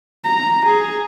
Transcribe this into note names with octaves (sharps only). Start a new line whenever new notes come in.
A#5
G#4